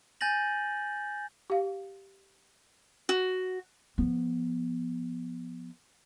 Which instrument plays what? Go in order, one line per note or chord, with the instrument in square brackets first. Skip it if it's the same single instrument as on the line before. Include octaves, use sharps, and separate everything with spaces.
[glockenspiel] G#5 G6 A6 A#6 F#7
[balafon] G4 F5
[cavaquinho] F#4
[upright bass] F3 B3